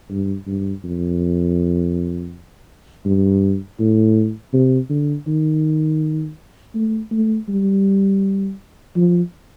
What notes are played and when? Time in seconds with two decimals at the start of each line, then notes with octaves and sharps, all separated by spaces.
0.10 G2
0.47 G2
0.84 F2
3.06 G2
3.80 A2
4.53 C3
4.90 D3
5.27 D#3
6.75 A3
7.12 A3
7.49 G3
8.97 F3